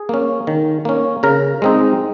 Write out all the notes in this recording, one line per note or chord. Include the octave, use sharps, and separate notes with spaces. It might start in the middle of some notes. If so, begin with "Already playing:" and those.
Already playing: G#4
A#3 C#4
D#3
A#3 C#4
C#3 A#4
G#3 C4 D#4